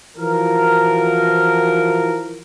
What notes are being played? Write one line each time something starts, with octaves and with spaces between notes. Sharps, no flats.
E3 F3 F#4 A#4